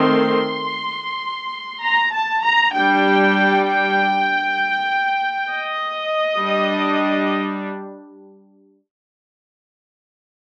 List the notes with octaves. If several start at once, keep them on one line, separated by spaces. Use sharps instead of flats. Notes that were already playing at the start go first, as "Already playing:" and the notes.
Already playing: D#3 A3 C4 C6
A#5
A5
A#5
G3 D4 G5
G5
D#5
G3 D4